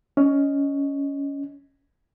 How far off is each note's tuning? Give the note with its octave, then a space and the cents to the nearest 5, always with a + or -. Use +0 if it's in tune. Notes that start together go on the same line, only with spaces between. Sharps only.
C#4 +15 D#5 +0